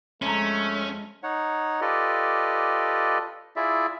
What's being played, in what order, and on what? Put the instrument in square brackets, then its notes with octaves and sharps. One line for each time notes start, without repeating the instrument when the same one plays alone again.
[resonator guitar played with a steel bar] F2 A#5 [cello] G#3 [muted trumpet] A3 [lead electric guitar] C#4
[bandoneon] D#4 C#5 F#5
F4 G4 A4 B4 D5 D#5
E4 F4 G#4 D5 E5